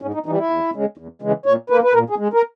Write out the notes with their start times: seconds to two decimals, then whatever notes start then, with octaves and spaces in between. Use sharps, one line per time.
0.02 G#2 C#4
0.14 D#4
0.26 E3 G3 D#4
0.38 E4
0.50 E2
0.74 C#3 G#3
0.97 E2
1.22 C#3 E3 G#3
1.46 A#2 C#5
1.70 A#3 B4
1.84 B4
1.94 A#2 A#4
2.10 G#4
2.18 G#3
2.33 A#4